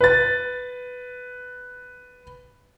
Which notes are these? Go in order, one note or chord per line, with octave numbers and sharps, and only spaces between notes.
B4 A6